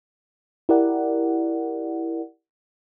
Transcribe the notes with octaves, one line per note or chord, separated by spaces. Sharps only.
E4 G4 A#4 D5 F#5